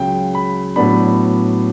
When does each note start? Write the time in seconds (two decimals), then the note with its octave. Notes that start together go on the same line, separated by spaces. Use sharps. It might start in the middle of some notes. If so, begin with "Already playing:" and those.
Already playing: C#2 C#3 F#3 G5
0.35 B5
0.76 A2 F#3 B3 D4 B5